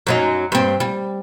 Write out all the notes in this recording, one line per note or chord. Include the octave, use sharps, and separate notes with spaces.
F#2 F#3 D#4
G2 C4
G3